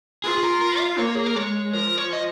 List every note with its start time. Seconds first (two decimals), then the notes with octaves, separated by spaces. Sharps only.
0.24 F4 G#4
0.38 G#4
0.43 A#4
0.61 A#4
0.80 F5
0.98 A#3 C#5
1.15 G#4
1.26 A#4
1.36 G#3 C#5
1.73 F3 A#4
1.98 C#5
2.13 D#5